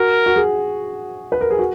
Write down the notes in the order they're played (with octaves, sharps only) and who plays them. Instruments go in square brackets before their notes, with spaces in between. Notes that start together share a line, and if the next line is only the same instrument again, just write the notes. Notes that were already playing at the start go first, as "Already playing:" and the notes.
Already playing: [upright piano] F#4 [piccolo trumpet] A#4
[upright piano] F#4
G#4
B4
A#4
G#4
F#4